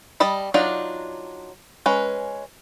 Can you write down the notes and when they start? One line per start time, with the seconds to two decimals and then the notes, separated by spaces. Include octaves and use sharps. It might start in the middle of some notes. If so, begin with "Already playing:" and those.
0.20 G3 D#5 A5 B5
0.54 F#3 D4 D#4 F4 D5
1.86 G#3 C#4 B4